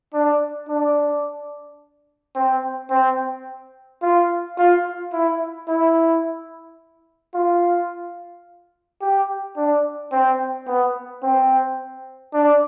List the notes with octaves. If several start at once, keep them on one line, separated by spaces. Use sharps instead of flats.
D4
D4
C4
C4
F4
F4
E4
E4
F4
G4
D4
C4
B3
C4
D4